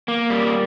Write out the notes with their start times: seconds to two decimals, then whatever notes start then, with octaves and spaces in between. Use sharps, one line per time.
0.08 A#3
0.30 G3